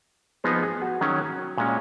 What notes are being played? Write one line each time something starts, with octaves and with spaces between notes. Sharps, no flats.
F3 B3 D#4 G#4
G#4
F#4
D#3 F#3 C#4
A#2 G#3 C#4